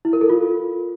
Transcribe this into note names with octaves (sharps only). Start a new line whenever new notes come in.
E4
A#4
A4
F4